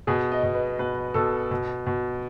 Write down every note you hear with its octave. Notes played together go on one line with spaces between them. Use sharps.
B2 G#4
D#5
B2
B4
B2 B4
B2 A4
B2
B2